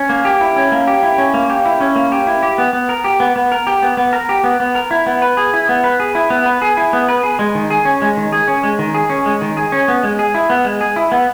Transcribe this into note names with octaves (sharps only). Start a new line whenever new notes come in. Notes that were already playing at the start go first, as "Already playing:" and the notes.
Already playing: C#4
A#3
G4
E4
C#4
A#3
G4
E4
C#4
A#3
G4
E4
C#4
A#3
G4
E4
G4
B3
B3
A#4
G4
B3
B3
A#4
G4
B3
B3
A#4
G4
B3
B3
A#4
E4
B3
B4
G#4
E4
B3
B4
G#4
E4
B3
B4
G#4
E4
B3
B4
G#4
G#3
D#3
G#4
C#4
G#3
D#3
G#4
C#4
G#3
D#3
G#4
C#4
G#3
D#3
G#4
C#4
B3
G#3
G#4
E4
B3
G#3
G#4
E4
B3